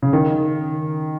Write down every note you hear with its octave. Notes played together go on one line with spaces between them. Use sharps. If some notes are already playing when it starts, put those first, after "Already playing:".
C#3
D#3